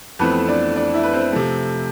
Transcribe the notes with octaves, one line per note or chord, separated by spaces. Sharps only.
F2 E3 A3 B3 C4 B4
D4 D5
D4 D5
E4 E5
B4
C4 C5
C3 F3 A3